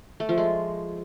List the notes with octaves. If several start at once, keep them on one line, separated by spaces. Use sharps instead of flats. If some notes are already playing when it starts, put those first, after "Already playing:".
A3
F3
G#3